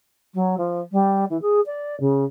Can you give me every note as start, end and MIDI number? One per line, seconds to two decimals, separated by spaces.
0.34 0.57 54
0.57 0.80 53
0.92 1.24 55
1.29 1.39 52
1.41 1.60 68
1.66 1.98 74
2.00 2.24 49